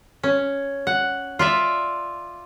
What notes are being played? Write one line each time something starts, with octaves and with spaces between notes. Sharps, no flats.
C#4
F#5
F4 D5 E5